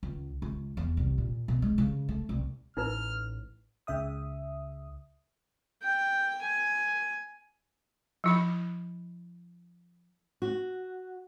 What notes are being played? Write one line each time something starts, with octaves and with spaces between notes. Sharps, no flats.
C#2
C#2
E2
C2
A#2
B2
G#3
C#3
A3
C2
A1 D#4 E4 B4 F6
C#2 C#3 E5 D#6
G5
G#5
F3 E4 B5
F#4